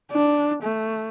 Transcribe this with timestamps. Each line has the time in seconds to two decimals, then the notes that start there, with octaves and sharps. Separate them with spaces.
0.11 D4
0.63 A3